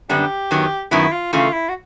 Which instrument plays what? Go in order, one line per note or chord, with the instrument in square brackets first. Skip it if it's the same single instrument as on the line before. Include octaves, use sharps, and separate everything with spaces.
[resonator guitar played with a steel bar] F#2 D3 G3 B3 D4 [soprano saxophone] G4
[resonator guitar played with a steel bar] F#2 D#3 F#3 B3
[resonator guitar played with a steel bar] F#2 D#3 F#3 B3 [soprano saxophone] E4
[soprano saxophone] F4
[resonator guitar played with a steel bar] C#3 E3 A3 [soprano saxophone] F4
[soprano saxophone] E4
F#4